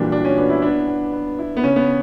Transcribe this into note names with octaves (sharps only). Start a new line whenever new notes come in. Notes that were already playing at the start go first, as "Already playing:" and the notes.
Already playing: A#2 E3 F#3 G3 A#3 D4
F#3 D4
C#4
B3 D4
E4
B3 D4
B3
B3
E4
B3
C#3 C#4
B3